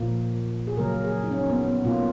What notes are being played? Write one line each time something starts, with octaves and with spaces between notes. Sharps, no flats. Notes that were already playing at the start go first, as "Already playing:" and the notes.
Already playing: A#2 F3 A#3
G#4
C#3 F#3 A#3 A#4
G#4
D#4
C#4
B3
B3
B2 A#3 F4